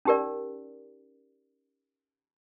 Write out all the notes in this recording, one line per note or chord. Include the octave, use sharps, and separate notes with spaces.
C#4 D#4 G4 A#4 D5